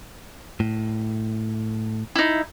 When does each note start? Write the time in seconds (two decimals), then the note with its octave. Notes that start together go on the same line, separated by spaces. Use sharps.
0.60 A2
2.15 D#4 E4